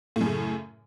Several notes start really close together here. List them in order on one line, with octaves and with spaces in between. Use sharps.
A2 F#2 C#3